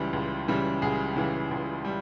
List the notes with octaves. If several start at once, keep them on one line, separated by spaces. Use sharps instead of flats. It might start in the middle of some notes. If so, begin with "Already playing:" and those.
Already playing: C#2 C#3 E3 G3 G4
C#2
C#3 E3 G3
C#2 G#4
C#3 E3 G3
C#2
G3